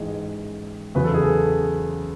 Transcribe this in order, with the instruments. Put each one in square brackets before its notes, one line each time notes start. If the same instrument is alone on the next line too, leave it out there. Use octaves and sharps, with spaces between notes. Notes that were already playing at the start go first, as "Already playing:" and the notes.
Already playing: [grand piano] A1 G#2 E3 G#4
E2 C#3 F#3 B4
A4
G#4
A4